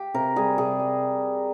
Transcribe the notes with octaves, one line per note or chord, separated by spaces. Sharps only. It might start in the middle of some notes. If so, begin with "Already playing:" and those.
Already playing: G4
C3 A#4
G3 G#4
C3 G#4
G3